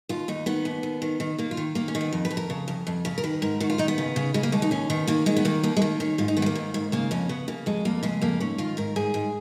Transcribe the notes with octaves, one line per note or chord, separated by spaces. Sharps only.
D#2 F4
D#2 D#4
D#3 B3
D#2
D#2
D#3
D#3
D#3 A#3
F4
D#3
D#3 A#3
C#4
D#3
B3
F2
B4
F2
A#4
C#3
F2
F2
C#3
A#4
D#3 B4
G#2 A#4
D#3 F#4
F4
D#3 D#4
B3
C#3
C#3
C#3 G#3
A#3
D#2 G#3
D#4
D#2 C#4
D#3 B3
D#3 A#3
D#3 G#3
B3
D#3 A#3
D#2 A#3
G#3
D#3 A#3
D#3 C#4
G#2 F4
D#4
D#3 B3
G#3
A#3
G#2
G#2
C#3 A#3
F2 C#4
C#3 B3
C#3 A#3
F2 G#3
F2 A#3
C#3 G#3
F2 A#3
G#2 C#4
D#3 F4
G#2 A#4
G#2 G#4
G#2